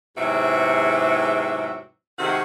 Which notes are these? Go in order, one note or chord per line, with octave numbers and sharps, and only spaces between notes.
E2 G#2 C3 F#3 E5
C3 D#3 G#3 A3 F#4